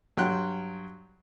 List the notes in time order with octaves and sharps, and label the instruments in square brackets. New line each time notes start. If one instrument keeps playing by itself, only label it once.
[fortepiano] G2 F#3 F#4 G5 C6 F#6